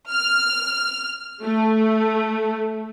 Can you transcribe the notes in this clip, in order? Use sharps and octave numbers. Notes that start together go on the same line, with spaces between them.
F6
A3